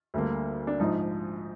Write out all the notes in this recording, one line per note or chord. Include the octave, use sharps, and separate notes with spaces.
D2 D3 G3 A#3
D4
A#1 G#2 F3 D#4